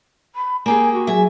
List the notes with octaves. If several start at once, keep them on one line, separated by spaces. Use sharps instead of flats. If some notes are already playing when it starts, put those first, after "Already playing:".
B5
A#3 G4 G#4 G#5
F#4
F#3 G#4 E5 G#5